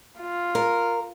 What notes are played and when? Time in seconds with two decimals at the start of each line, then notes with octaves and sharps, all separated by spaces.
0.19 F4
0.55 A#4